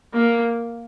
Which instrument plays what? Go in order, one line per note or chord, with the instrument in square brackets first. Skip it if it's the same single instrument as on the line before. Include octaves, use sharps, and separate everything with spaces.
[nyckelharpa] A#3